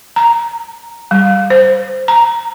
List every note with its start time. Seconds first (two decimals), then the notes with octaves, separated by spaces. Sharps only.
0.16 A#5
1.11 G3
1.50 C5
2.08 A#5